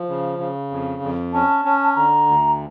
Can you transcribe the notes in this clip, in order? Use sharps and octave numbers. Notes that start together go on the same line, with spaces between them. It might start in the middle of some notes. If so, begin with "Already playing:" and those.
Already playing: F3
C#3
C#3
F2
F2
C#4 A5
C#4
D3 A#5
D2